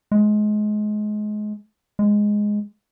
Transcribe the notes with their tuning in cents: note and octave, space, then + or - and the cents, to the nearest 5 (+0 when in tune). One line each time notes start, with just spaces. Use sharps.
G#3 +25
G#3 +0